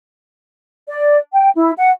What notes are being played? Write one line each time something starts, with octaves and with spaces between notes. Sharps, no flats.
D5
G5
E4
F#5